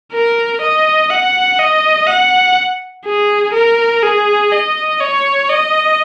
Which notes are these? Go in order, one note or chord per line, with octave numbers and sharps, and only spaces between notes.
A#4
D#5
F#5
D#5
F#5
G#4
A#4
G#4
D#5
C#5
D#5